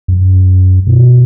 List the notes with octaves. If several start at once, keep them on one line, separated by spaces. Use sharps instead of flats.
F#2
B2